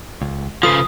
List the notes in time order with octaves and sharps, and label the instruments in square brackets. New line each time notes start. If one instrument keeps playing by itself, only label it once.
[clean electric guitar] C#2
[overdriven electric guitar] C#3 F3 [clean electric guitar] F4 A4 B4 [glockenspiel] D#6